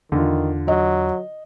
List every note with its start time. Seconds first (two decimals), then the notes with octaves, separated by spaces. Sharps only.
0.12 E2 D3 D#3 F4
0.68 F#3 D#5